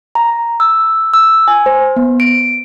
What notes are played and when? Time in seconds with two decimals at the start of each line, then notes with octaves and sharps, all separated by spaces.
0.15 A#5
0.60 E6
1.14 E6
1.48 G#5
1.66 C5
1.96 B3
2.20 D7